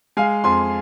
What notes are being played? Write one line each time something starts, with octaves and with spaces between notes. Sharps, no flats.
G#3 F5 G#5
F2 G#5 C6